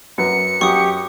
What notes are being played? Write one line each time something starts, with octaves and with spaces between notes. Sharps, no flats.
F#2 B4 C#7
F#2 G4 C#6 D#6